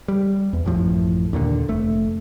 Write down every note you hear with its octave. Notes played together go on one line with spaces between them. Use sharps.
G3
E2
A1 F#2 A2 F3
D#2 A#2 D3
F1 A3